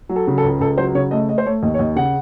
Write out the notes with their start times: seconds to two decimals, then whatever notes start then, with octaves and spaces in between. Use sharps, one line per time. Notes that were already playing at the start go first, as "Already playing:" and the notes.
0.09 F#3
0.16 A4
0.27 C#3
0.38 A4
0.44 C#2
0.60 C#2 A4
0.78 F#3 C5
0.95 C#3 C#5
1.11 A3 D#5
1.29 A3 D#5
1.38 C5
1.46 A3 C#5
1.63 D#2 D#5
1.74 C#5
1.79 D#2 D#5
1.96 C#3 F#5